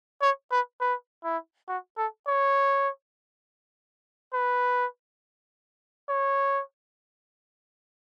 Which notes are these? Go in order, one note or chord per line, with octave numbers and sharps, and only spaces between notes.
C#5
B4
B4
E4
F#4
A4
C#5
B4
C#5